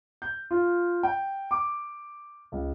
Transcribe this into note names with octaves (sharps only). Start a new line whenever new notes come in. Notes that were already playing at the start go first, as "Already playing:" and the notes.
G6
F4
G5
D6
C#2